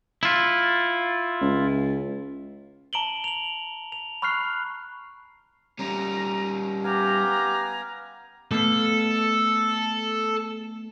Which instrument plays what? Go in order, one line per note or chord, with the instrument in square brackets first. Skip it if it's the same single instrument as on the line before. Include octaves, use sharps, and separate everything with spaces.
[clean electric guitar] E4 F4
[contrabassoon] C#2
[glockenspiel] A5 A#5 D7 F#7 G7
F7 F#7
F7
B5 C#6 F6 F#6 C7
[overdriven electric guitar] G3 C#4 [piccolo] A#5
[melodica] B3 F5 G#5 [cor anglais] G4 [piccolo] A#5
[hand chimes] A3 B3 [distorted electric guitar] A4